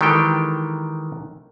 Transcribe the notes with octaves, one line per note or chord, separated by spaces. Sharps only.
D#3 E3 G#3 G4 A4 G5